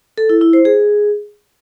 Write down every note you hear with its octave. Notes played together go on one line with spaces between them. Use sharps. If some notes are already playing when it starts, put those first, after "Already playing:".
A4
E4
E4
C5
G#4